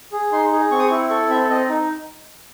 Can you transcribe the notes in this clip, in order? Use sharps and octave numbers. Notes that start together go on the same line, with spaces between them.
G#4
D#4 C6
G#4
C4 C#6
D#6
C#6
E4
A4 C#6
C4 E5
C4 D#5
D#4